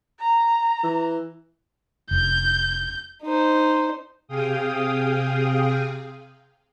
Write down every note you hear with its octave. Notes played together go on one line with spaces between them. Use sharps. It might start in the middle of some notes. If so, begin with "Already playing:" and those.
A#5
E3
F1 G6
D#4 C5
C3 G#4 F5 G5 D#6